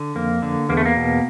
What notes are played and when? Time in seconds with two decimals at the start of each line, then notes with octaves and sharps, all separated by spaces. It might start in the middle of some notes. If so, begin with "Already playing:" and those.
Already playing: D3
0.15 F2 A#3
0.42 D3
0.69 E2 A#3
0.77 A3
0.86 A#3
0.96 B2